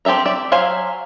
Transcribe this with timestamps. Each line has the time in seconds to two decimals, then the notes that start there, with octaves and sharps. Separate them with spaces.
0.05 C4 G4 A4 E5 A#5
0.26 D5 E5
0.52 F#3 C5 E5 F5 G#5